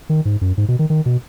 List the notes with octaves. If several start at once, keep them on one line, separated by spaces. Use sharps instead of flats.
D#3
G#2
F#2
G#2
B2
D#3
D#3
B2